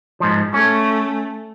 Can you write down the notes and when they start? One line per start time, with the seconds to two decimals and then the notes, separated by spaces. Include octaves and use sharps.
0.20 G#2 F3
0.54 A3 C#4